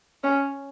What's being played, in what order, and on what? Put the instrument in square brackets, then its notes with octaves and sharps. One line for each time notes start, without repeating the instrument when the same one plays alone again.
[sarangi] C#4